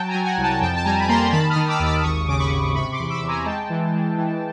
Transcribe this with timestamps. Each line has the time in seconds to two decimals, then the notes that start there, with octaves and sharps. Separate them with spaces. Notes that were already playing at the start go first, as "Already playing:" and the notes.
Already playing: F#3 G5 A5
0.08 G#5 A#5
0.14 F#3
0.25 F#5 G#5
0.37 C2
0.43 G5 A5
0.61 F2 G5 A5
0.77 A5
0.84 G3 G#5 A#5
1.00 B5
1.09 A#3 A#5 C6
1.32 D#3 A5 B5
1.50 D#6 F6
1.56 D#3
1.68 D6 E6
1.79 D#2
1.85 D6 E6
2.03 G#1 C#6 D#6
2.28 C#3 D6
2.40 B5 C#6
2.52 G#1
2.75 C3 B5 C#6
2.92 C6 D6
2.99 E2
3.10 D6 E6
3.23 E2
3.28 G#5 A#5
3.45 G#3 G5 A5
3.70 E3
3.94 G#3
4.18 E3